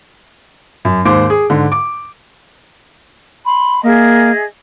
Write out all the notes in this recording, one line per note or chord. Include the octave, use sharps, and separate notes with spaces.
F#2
D#2 G#2 C5 D6
G#4
G#2 D3
D6
B5 C6
A#3 G#4 D#5 E5